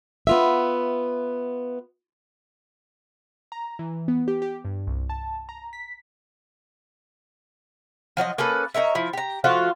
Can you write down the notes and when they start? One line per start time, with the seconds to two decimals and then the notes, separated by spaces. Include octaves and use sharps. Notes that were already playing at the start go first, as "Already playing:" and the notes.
0.27 B3 F4 E5
3.52 A#5
3.79 E3
4.08 B3
4.28 G4
4.42 G4
4.65 G2
4.87 C2
5.10 A5
5.49 A#5
5.73 B6
8.17 F3 F#3 D5 D#5
8.38 A#3 C#4 A4 B4
8.74 D#4 A#4 C#5 E5
8.95 F3 E4
9.13 G4 A#5
9.44 F3 A3 F4 F#4